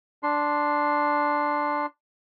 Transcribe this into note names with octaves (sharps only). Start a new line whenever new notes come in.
D4 C6